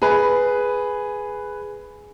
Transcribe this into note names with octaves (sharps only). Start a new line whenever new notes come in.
G#4 B4